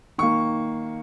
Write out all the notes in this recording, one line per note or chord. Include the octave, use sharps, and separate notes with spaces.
D#3 A#3 C#6